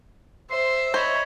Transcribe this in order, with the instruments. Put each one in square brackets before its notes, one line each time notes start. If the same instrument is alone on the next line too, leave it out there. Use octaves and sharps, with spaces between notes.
[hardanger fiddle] C5 [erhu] E5 [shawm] C6
[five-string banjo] C5 [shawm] C#5 [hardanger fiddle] D#5 B5